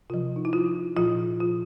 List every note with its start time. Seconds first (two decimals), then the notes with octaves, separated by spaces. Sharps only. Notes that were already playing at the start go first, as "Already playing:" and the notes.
0.10 C3 F3 F4
0.36 D#4
0.45 E4
0.53 F4
0.97 A#2 F3 F4
1.40 F4